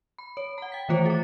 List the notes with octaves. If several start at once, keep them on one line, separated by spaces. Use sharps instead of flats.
B5
C#5
F#5 A#5
G5 B6
D#3 E3 A3 F4 C5 C#5
G#4 D6